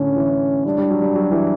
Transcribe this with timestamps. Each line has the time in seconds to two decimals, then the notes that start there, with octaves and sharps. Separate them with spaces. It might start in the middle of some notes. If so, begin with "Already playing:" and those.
Already playing: A2 D3 C#4
0.16 E3
0.65 G3 D4
0.78 G3
0.90 F#3
1.02 G3
1.15 F#3
1.31 E3